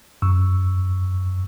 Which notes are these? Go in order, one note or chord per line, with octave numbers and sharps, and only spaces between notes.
F#2 C#6 E6